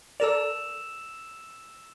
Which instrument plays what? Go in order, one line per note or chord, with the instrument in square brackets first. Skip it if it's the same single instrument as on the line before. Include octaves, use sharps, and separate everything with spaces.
[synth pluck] A4 A#4 D5 [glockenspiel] E6 E7 F7